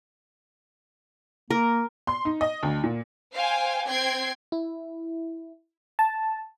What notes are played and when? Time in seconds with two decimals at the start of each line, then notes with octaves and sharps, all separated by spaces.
1.50 A#3 A#4
2.07 C6
2.25 D#4
2.41 D#5
2.63 D2
2.84 A#2
3.33 C5 F5 G5 G#5
3.86 C4 G5 G#6 C7
4.52 E4
5.99 A5